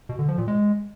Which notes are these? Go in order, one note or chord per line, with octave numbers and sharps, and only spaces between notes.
B2
D3
F3
A#2
G#3